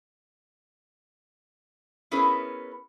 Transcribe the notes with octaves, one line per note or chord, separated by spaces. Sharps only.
B3 C#4 E4 G#4 A#4 B4